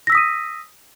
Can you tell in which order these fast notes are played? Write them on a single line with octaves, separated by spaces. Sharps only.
A#6 E6 B6 D#6 D#7